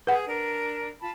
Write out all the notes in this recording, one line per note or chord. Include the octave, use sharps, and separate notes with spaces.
G#4 B4 F#5
D4 A#4
F4 A5 B5